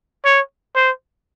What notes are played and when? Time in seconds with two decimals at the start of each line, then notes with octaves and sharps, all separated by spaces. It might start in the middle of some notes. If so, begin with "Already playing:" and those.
0.25 C#5
0.75 C5